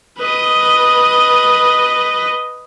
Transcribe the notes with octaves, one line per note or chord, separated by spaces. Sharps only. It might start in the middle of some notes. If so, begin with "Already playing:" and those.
B4 D#5